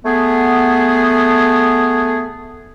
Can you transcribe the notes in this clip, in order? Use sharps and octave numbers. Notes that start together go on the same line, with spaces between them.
A3 B3 G#4